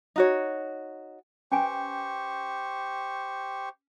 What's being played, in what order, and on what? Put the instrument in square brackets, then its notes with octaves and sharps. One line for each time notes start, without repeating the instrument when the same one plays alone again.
[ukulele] D#4 F#4 C#5
[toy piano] C#4 B4 G#5 [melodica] G4 C5 C#6